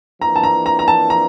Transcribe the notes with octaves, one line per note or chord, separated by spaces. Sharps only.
F2 E3 A#3 D4 A#5
A5
A#5
A#5
A#5
A5
A#5